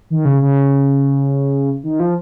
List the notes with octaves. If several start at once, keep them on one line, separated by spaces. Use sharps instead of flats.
D#3
C#3
C#3
D#3
F3